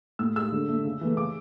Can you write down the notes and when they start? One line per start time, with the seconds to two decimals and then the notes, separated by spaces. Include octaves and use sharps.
0.19 A2 E6
0.36 G#3 E6
0.52 D3
0.69 A3
0.85 C#3
1.01 E3 A3
1.17 C#3 D6